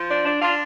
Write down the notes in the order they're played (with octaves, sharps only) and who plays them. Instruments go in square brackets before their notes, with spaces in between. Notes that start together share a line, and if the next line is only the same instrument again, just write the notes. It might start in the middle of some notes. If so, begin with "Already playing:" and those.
Already playing: [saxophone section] F3
D4
D4
D4 F4